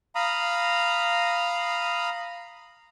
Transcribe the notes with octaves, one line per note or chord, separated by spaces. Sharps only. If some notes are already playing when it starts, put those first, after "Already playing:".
F5 A#5 B5 D#6